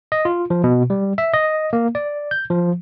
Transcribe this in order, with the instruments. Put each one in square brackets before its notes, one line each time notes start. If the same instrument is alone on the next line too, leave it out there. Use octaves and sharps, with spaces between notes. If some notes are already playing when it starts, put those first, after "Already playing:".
[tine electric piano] D#5
F4
F3
B2
G3
E5
D#5
A#3
D5
G6
F3